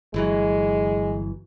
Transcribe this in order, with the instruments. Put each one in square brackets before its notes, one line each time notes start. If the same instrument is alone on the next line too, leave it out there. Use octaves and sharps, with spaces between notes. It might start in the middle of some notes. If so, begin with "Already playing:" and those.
[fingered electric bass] G1 E3 F#3 [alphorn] G#3